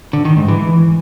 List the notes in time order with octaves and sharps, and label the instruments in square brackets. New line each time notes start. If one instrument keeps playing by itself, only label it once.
[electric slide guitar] D3
D#3
G#2
E3